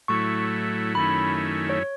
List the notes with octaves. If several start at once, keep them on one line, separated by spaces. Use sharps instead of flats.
A2 F#3 A3 E4 C#6
F#2 D#3 A3 C#4 E4 B5
C#5